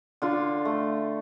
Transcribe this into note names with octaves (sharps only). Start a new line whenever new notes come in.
D3 F4
A3